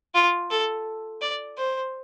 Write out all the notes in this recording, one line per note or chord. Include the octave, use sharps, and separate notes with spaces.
F4
A4
D5
C5